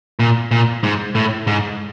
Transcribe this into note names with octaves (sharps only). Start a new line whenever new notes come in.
A#2
A#2
G#2
A2
G#2